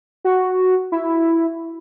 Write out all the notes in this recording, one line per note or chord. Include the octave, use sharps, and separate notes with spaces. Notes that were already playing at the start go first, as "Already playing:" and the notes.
F#4
E4